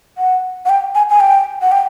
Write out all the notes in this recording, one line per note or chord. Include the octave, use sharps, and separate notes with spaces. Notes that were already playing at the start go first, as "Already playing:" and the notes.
F#5
F#5
G5
G#5
G#5
G5
F#5
G5